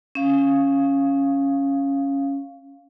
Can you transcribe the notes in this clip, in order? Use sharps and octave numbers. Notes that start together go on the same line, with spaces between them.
C#4 F5